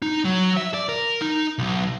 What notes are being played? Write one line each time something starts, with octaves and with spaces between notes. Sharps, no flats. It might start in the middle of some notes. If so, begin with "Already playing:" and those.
D#4
F#3
E5
D5
A#4
D#4
B1